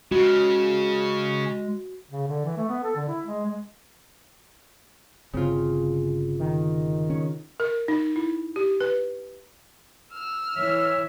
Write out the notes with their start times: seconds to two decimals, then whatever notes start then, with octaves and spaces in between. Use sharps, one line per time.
0.11 C#3 G#3 F#4
2.10 C#3
2.27 D3
2.45 E3
2.57 A3
2.69 B3
2.84 A4
2.96 D3
3.08 E4
3.26 G#3
3.46 G#3
5.33 G1 C#3 C4 F4
6.39 D#3
7.10 C#4
7.60 A#4
7.88 D#4
8.16 E4
8.56 G4
8.80 B4
10.13 E6 F6
10.56 E3 C#5 E5